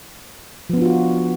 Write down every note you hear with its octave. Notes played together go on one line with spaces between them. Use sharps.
F3 B3 D4 F4 F#4